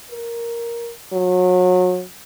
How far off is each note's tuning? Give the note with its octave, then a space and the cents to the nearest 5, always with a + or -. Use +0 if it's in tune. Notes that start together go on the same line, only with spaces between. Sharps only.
A#4 +5
F#3 -30